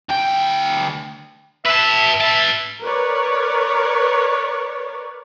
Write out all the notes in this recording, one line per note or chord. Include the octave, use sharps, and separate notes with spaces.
D2 G5
B4 E5 A5
B4 E5 A5
A#4 B4 C#5 D5